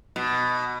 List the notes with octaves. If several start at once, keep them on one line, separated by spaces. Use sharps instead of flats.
B2